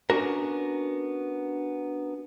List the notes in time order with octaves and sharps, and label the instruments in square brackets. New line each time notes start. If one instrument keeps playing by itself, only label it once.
[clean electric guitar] B3 C#4 D4 F#4 A#4